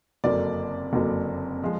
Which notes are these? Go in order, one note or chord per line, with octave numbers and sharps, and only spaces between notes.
F#1 F2 D3 F#3 A#3 D5
F#1 F2 D3 F#3 A#3
F3 G#3